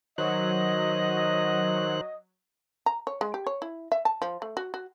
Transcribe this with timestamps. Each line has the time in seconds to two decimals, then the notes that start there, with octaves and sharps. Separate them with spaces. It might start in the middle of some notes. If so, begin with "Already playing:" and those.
0.18 D#3 F#3 C5 D#5 F#6
2.86 A#5
3.07 C#5
3.21 G#3
3.34 G4
3.47 C#5
3.62 E4
3.92 E5
4.05 A5
4.22 F3
4.42 A3
4.57 F#4
4.74 F#4